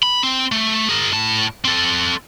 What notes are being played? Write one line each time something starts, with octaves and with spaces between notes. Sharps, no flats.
B5
C4
A3
G#4 A#4
A2 A5
C4 A4